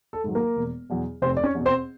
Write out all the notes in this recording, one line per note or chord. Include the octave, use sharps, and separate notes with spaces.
A4
G#2 D#3 F#3
A#3 A#4
E1
E2 B2 F#3
F1 C4 C5
D5
C#4 C#5
E2 B2
C4 C5